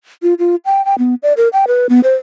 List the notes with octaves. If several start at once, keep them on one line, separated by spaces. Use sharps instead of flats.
F4
F4
G5
G5
B3
D5
A#4
G5
B4
B3
C5